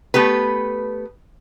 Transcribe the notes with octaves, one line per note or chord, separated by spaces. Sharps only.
A3 B3 G4 B4